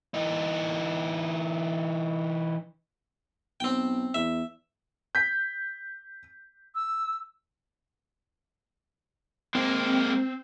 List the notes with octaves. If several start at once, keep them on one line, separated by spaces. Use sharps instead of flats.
E3 D#4
B1 C4 G5
E2 E5
G6 B6
E6
G#3 A#3 C4